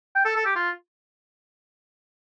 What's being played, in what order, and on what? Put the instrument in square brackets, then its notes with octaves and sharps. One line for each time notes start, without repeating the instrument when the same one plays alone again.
[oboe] G5
A4
A4
G4
F4